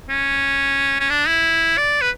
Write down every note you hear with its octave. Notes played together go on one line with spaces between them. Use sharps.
C#4
C#4
D4
E4
D5
B4